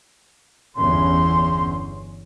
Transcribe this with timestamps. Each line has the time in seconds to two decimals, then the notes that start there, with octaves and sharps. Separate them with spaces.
0.76 G1 E2 C#4 C6